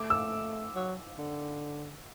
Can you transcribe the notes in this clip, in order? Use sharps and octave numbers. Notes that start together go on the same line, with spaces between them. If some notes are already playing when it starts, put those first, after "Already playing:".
Already playing: A3 D6
E6
F#3
D3